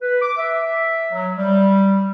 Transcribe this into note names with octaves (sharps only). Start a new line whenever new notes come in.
B4
D6
E5
F#3
G3